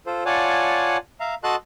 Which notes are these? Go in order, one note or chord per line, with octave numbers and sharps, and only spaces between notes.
F4 A4 C5
F4 C#5 D5 F#5 G#5 A5
E5 F5 A#5
F#4 A4 D#5 A5 C6 F#6